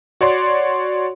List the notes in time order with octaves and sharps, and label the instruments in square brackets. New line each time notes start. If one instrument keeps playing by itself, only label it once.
[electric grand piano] F#4 C#5 D5 C6